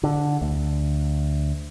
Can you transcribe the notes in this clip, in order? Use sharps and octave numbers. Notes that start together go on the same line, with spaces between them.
D3
D2